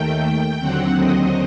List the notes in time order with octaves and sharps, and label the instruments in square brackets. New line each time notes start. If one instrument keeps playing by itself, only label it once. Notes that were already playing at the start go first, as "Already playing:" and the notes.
Already playing: [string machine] D#2 D#3 A3 G5
D#2 D3 F#3 C4 F#5
D#5